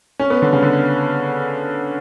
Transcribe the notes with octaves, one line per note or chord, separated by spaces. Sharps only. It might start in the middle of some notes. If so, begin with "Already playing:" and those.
C#4
B3
D3
C#3
D3